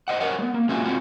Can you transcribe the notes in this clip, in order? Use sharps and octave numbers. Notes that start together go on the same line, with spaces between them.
C5 D#5 F#5
A#4 B4 C#5 F#5
G#3 B3
A#3
G#3 C#4 F4 F#4 E5
G#3 C4 F4 F#4